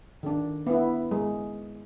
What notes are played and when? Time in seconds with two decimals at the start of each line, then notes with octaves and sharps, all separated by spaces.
0.23 D#3 D4
0.67 B3 E4
1.11 G#3